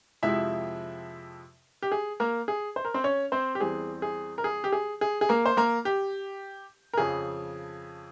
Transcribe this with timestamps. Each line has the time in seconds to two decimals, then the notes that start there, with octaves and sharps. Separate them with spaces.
0.23 F2 C3 F3 G#3 E4 E5
1.82 G4
1.92 G#4
2.20 A#3 A#4
2.48 G#4
2.76 C5
2.85 A#4
2.94 C4 C5
3.04 C#4 C#5
3.32 C4 C5
3.55 G4
3.60 E2 E3 G3 C4 G#4
4.02 G#4
4.38 A#4
4.44 G#4
4.64 G4
4.72 G#4
5.01 G#4
5.21 G#4
5.29 A#3 A#4
5.46 C5
5.57 A#3 A#4
5.85 G4
6.93 A#4
6.98 F2 C#3 F3 G#4